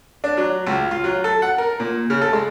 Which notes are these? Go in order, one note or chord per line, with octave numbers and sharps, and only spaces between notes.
D4
F#3
C#2
F4
F#3
A4
F#5
A#4
A#2
C#3
A4
G#3